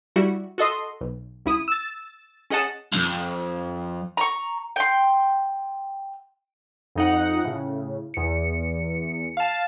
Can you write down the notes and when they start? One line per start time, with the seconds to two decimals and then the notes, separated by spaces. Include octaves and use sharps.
0.16 G3 E4 F#4
0.58 F#4 A4 D#5 C6
1.01 B1
1.46 C#2 E4 D#6
1.68 E6 A6
2.50 C#4 G#4 D#5 F#5 A5
2.93 C2 F2
4.17 A#5 C#6
4.76 G5 C6
6.96 F2 D#4 F#5
7.45 A2 C#3
8.14 E2 C#7
9.37 F5 A5